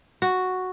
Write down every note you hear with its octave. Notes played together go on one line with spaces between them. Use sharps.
F#4